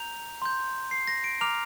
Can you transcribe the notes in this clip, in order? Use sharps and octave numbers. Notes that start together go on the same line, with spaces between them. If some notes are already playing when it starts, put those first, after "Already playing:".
Already playing: A#5 G6 F7
C6 G6
C7
A#6
D7
A#5 D6 F6 F7